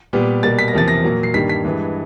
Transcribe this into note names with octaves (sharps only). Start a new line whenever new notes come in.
A#2 G3 B3
B2 G3 A#3 A6
B6
A#6
E2 C3 F3 A#3 A6
A#6
A#2 F#3 A#3
C7
G2 D#3 G3 A#3 B6
B6
G2 E3 G#3